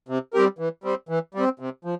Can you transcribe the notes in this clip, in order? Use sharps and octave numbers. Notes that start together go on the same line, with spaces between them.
C3
G3 C4 G4 A#4
E3
G3 C4
E3
G3 C4
C3
F3